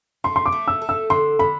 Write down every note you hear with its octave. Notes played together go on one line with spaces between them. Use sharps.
A3 C6
C6
D6
A3
E6
A4
E6
D3 C6
D3 B5